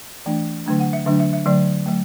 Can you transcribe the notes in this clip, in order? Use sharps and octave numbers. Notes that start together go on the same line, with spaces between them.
E3 A3 D4
D3 F#3 A3 D4
F#5
E5
D3 F#3 A3 D4 E5
E5
E5
D3 F#3 A3 D5
F#3 A3